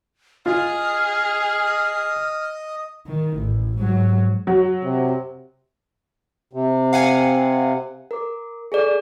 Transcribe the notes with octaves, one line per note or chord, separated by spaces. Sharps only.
F4 G#4 D#5 F6
D#3
A1
G#2 F#3
F#3
C3
C3
F5 F#5 G#5
A#4 D6
G#4 A4 D5